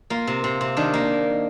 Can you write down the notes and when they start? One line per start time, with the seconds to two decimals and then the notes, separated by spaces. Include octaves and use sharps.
0.10 A#3 F4
0.27 C3
0.44 C3
0.61 C3
0.77 D#3 D4
0.93 A#3